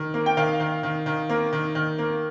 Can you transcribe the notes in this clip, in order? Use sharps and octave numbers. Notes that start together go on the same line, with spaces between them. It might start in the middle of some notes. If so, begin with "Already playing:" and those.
Already playing: D#3
A#3
G5
D#3 F5
D#3
D#3
D#3
A#3
D#3
D#3
A#3